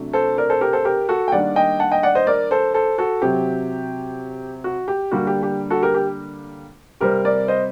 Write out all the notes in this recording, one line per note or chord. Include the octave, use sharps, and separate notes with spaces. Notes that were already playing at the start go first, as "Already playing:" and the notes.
Already playing: C3 F#3 A3 D4
A4 C5
A#4 D5
A4 C5
G4 A#4
A4 C5
G4 A#4
F#4 A4
G5
D#3 G3 A#3 D4 D5 F#5
D#5 G5
F#5 A5
D#5 G5
D5 F#5
C5 D#5
A#4 D5
A4 C5
A4 C5
F#4 A4
C3 F#3 C4 G4
F#4
G4
D3 G3 A#3 D4 F#4
G4
G4
F#4 A4
G4 A#4
G4
C3 G3 C4 G4 A#4
A#4 D5
C5 D#5